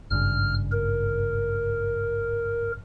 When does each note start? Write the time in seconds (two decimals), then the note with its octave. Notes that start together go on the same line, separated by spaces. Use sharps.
0.11 G#1 G2 C#3 F6
0.72 A#4